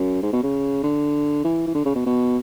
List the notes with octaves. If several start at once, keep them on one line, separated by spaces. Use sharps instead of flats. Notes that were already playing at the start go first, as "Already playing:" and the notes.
Already playing: F#2
G#2
B2
C#3
D3
E3
E3
D3
C#3
B2
B2